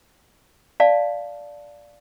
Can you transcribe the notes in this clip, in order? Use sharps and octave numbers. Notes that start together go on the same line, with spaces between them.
D5 F5 A5